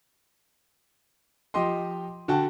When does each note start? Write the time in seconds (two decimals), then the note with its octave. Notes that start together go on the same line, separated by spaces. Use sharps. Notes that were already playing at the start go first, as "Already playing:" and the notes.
1.54 F3 G4 D#5 C6
2.28 D3 F#4 G5 A5